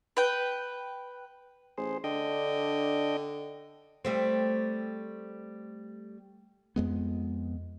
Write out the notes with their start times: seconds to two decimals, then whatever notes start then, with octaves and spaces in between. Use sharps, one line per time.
0.17 B4 G5
1.78 A1 G#4 C5
2.04 D3 D4 D#5 G5
4.05 G3 A3 C4
6.76 F2 G#3 B3